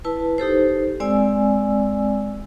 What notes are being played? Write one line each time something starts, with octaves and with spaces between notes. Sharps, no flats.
E4 B4 A5
D#4 G4 A4 C5
G#3 C4 D5 G#5 E6